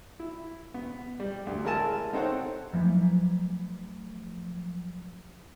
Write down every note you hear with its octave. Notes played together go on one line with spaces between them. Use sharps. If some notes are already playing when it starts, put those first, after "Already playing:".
E4
B3
G3
D2
A1 G#3 A#4 G#5 A5 E6
C4 D#4 A4 C5 C#5 F#5
F3 F#3 A3